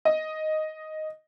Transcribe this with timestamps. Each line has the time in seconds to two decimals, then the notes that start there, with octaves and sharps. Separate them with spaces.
0.05 D#5